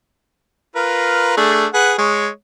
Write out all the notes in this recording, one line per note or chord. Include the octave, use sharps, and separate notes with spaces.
F4 A#4 B4
A3 D4 G#4
G#4 B4 F#5
G#3 C#5